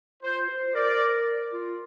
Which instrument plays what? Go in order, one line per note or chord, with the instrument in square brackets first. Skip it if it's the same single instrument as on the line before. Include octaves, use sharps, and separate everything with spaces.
[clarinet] F4 [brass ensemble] C5
[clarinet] C5
[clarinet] A#4 [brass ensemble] D5
[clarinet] F4